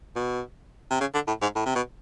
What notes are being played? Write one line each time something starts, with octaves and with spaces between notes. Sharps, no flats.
B2
C3
C#3
D3
A2
G#2
A2
C3
B2